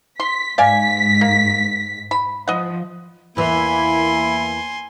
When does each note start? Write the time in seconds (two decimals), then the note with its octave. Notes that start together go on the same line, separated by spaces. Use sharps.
0.20 C6 B6
0.58 G#2 D5 F5 G#5 B6
1.21 A#3
2.11 B5
2.48 F3 D#5 F#5
3.37 E2 E3 A#3 E4 E5 G#5 B5 C6